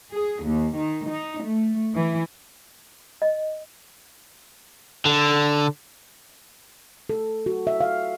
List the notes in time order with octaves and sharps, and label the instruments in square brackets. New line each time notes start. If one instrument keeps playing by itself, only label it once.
[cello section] G#4
D#2
D#3
D#4
A3
E3
[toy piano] D#5
[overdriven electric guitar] D3
[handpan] A4
F#4
E5
F5